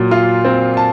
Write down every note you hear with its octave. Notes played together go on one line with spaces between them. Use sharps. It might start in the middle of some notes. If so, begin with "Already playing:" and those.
Already playing: A#2 F#3
F4
C4
A5